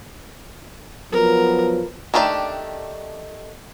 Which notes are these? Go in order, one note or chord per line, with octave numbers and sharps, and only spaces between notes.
F3 F#3 B3 A#4
D#3 A3 D4 G4 D5